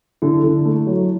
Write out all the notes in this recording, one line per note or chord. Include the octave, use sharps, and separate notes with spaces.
D3 E4
D3
A3
F#3